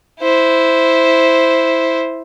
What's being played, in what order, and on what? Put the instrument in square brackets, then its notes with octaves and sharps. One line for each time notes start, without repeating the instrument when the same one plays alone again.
[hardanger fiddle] E4 C5